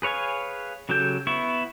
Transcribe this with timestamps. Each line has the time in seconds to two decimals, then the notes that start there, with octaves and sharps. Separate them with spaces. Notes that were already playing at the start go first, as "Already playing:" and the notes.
0.02 G#4 B4 C#5 F5 G#5
0.89 C#3 F#3 G4 A4 G6
1.27 B3 E4 C#6